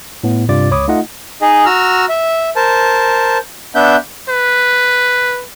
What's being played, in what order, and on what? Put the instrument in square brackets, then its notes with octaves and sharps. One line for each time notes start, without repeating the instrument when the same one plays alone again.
[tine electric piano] A2 B3
G2 C3 F4 D5 D6 A6
C#2 C#5 B5 D6 D#6
A3 D#4 F4 D#5 F#5
[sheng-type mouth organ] D#4 G#4 D#5
F#4 A#5 E6 F6
E5
A#4 C5 A5
B3 D4 E5 G6
[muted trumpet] B4